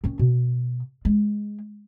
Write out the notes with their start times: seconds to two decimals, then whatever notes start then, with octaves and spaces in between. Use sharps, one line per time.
0.04 D#3 C#4
0.19 B2
1.05 G#3